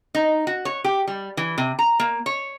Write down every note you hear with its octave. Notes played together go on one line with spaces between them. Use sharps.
D#4
F#4
C#5
G4
G3
E3
C3
A#5
A#3
C#5